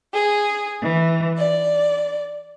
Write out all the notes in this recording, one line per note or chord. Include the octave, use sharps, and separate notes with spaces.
G#4
E3
D5